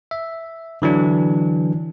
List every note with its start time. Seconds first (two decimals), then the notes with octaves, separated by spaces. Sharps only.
0.11 E5
0.82 D3 E3 F#3 D4